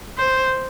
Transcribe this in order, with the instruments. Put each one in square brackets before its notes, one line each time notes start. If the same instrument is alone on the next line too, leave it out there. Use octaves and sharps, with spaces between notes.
[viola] C5